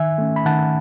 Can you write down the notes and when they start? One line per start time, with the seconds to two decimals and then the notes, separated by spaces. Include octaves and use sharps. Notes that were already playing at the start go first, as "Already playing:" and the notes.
Already playing: D#3 E5 G#5
0.18 A3 C#4
0.36 B5
0.45 D#3 F#5 A5